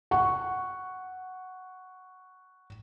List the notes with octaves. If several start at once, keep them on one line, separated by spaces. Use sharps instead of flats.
F#5 C#6